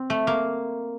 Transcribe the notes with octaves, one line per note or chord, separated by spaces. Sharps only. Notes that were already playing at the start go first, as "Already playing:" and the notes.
Already playing: C4
A3
A#3